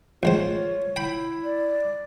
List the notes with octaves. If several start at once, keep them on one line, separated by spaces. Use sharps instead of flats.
A1 G#3 F4 C5 C#5
E4 G5 B5
D5